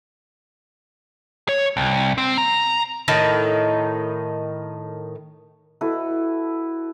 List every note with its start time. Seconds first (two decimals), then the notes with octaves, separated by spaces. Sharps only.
1.49 C#5
1.77 C2
2.18 C4
2.38 A#5
3.08 A2 D#3 D#4
5.81 E4 F#4 A4 B4